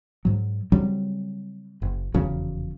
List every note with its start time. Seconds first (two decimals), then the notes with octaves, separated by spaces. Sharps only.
0.25 G#2 F#3
0.72 C#3 F#3 G3 C4
1.82 F#1
2.14 F1 E2 C#3 F#3